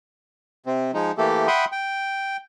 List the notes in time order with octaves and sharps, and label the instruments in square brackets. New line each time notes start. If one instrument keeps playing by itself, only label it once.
[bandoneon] C3 C4
F3 G#3 D#4
E3 A3 A#3 G4 A4
E5 F#5 G5 B5 C6 D#6
G5